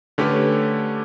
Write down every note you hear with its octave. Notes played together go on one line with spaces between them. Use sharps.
D3 A3 C#4 G4 B4